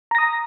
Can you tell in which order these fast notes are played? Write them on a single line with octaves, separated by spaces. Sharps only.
A#5 A#6 D#6